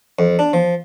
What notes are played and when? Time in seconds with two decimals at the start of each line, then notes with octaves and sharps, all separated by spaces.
0.19 F2
0.39 D4
0.53 F3